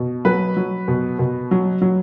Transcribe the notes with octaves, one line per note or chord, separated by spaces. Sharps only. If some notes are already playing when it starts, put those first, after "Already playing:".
Already playing: B2
F#3 B4
F#3
B2
B2
F#3
F#3